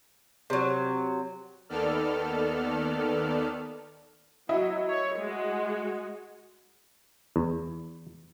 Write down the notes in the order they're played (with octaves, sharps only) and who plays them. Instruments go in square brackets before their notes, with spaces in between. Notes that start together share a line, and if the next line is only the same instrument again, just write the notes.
[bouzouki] C3 F#3
[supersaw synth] D#2 D#3 B3 A4 D5 F6
[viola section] F#3 [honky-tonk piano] E4 D#5 E5
[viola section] C#5
G#3 F#4
[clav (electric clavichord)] E2